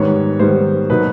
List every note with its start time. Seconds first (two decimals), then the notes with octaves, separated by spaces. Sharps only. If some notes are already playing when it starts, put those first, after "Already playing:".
Already playing: G#2 D#3 G3 B3 C#5
0.39 G#2 D#3 G3 B3 C5
0.90 B2 F#3 A#3 D#4 B4